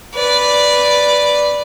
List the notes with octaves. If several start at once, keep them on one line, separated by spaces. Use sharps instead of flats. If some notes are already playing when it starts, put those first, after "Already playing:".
B4 D5